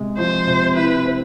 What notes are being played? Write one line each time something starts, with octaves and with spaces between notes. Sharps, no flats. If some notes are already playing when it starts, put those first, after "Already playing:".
Already playing: C3 G#3
F3 C5
C3
E4 B4
C4